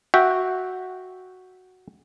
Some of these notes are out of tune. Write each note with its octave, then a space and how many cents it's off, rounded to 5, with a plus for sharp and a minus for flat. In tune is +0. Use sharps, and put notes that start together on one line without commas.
F#4 +0 E5 -5 G5 +0